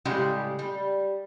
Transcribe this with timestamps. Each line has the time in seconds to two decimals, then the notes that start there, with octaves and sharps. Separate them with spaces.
0.05 A2 C#3 G3 G#3 G4
0.59 G3